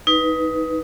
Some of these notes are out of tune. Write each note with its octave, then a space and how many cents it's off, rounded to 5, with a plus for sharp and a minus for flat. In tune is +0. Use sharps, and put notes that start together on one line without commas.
D#4 +20 B4 +0